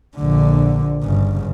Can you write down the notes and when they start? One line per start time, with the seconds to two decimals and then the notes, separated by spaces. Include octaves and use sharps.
0.17 A#1 D3
1.04 G1 C#3